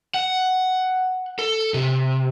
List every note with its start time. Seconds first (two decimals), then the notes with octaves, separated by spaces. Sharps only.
0.14 F#5
1.39 A4
1.74 C3